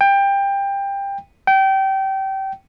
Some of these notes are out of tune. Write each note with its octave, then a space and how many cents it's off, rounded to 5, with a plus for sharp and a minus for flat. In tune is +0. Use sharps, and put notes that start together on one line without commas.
G5 +20
G5 -25